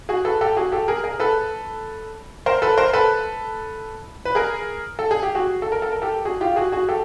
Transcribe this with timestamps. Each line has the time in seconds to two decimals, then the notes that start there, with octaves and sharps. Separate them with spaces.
0.09 F#4 G#4
0.25 A4 B4
0.41 G4 A4
0.56 F#4 G#4
0.72 G4 A4
0.88 G#4 A#4
1.04 G#4 A#4
1.20 A4 B4
2.46 A#4 C5
2.62 A4 B4
2.77 A#4 C5
2.93 A4 B4
4.25 B4
4.35 G#4 A#4
4.99 A4
5.11 G#4
5.23 G4
5.35 F#4 G#4
5.62 A4
5.72 A#4
5.82 A4
5.92 A#4
6.02 G4 A4
6.25 F#4 G#4
6.41 F4 G4
6.56 F#4 G#4
6.72 F#4 G#4
6.89 G4 A4